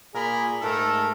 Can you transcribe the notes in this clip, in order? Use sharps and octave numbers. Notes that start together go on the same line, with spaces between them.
A#2 G#4 A#4 B5
G#2 A3 A4 A#4